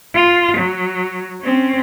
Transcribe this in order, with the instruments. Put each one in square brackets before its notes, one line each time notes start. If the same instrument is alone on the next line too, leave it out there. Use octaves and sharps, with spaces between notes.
[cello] F4
F#3
C4 C#4